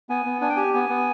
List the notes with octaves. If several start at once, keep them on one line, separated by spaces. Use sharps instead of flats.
B3 G#5
B3
D4 G#5
G5
G4 G#5
B3 G#5
B3